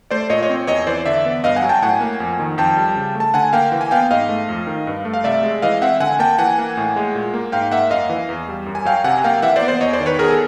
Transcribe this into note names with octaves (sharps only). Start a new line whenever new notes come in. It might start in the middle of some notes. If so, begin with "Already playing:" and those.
A3 C5 D5
A#2 C#5 D#5
C#5 D#5
C4
E2 C#5 D#5
E3 C5 D5
D3 D5 E5
B3
G2 D#5 F5
F#5 G#5
F#3
G5 A5
A2 F#5 G#5
A#3
F2
D#3
F2 G5 A5
G3
C#3
A3
A5
D3 F#5 G#5
A#3 F5 G5
E3
G#5
B3 F5 G5
G#2 D#5 F5
A3
F2
D#3
G2
A3
F5
C3 D5 E5
G#3
E3 D#5 F5
C4 E5 F#5
D3 F#5 G#5
A#3 G5 A5
E3 F#5 G#5
A#3
A2
G#3
A#2
A#3
G#2 F5 G5
A#3 E5 F#5
F#2 D#5 F5
E3
E2
G3
F#2
G#5
F#3 F5 G5
C3 F#5 G#5
A#3 F5 G5
E3 E5 F#5
C5 D5
B3
C5 D5
E2 C#5 D#5
C5 D5
D#3
B4 C#5
B2 G#4 A#4
A4